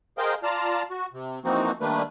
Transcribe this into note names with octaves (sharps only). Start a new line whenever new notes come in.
G#4 A#4 C5 D#5 F5 G5
F4 D5 F5 A5 A#5 F6
F#4
C3
E3 F3 A#3 C4 D#4 F#4
D#3 G3 A3 A#3 D4 B4